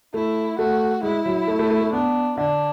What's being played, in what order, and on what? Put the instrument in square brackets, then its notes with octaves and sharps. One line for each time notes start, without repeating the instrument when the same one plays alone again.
[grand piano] A3 [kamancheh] E4
[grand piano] A3 [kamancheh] F#4
[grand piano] G#3 [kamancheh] E4
[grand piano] F#3
A3
A3
A3
A3
[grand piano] B3 [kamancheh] D4
[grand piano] D3 [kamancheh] D4